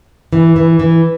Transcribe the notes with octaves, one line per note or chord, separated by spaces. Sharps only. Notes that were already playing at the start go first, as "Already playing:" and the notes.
E3
E3
E3